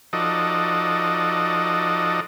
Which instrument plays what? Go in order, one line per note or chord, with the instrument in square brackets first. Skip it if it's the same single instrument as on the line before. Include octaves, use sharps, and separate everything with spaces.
[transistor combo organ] F3 D#4 F#4 A4 D5 D#5